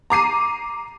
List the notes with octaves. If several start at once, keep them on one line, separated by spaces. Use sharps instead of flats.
A#5 D6 C7 D#7